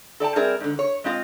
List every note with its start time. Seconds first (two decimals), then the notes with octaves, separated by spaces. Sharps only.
0.20 A4 D5 G5 A5
0.35 G3 C4 G#4 A#4 D5 E5
0.60 G#2 D3
0.79 C#5
1.04 G#3 C4 F4 D#5